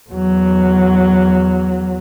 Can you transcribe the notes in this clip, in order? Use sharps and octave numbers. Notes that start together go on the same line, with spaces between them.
E2 F#3